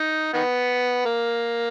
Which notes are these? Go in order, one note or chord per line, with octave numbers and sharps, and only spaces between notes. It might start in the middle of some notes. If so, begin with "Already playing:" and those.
Already playing: D#4
D#3 B3
A#3